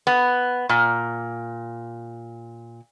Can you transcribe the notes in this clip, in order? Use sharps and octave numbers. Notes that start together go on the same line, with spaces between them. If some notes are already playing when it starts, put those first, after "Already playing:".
B3
A#2